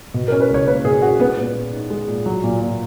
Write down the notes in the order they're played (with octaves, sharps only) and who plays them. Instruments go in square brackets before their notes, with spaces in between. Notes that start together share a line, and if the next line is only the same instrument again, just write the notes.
[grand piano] B2
[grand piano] C#4 [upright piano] A#4
[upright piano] B4
[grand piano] C#2 [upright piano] C#5
[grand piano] A#3 [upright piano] B4
[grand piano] B2 [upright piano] G#4
[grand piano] C#4 [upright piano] F#4
[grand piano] G#3 [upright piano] B3
[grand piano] A#2
A#2
D#4
G#3
A#2
F#3
A#2
A#2